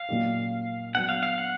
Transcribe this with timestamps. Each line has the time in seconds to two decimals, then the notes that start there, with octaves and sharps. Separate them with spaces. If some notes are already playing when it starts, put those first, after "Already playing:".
Already playing: F5
0.09 A#2 F#3 A#3 D#4 G4
0.95 F#3 B3 D4 F#5
1.09 F5
1.23 F5
1.38 F#5